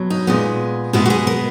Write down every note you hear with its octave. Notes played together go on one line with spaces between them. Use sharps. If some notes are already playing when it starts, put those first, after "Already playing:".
Already playing: B2 F#3
D#4
A#2 G#3 B3
B2 G#3 B3 E4
F#4
G#4
A#4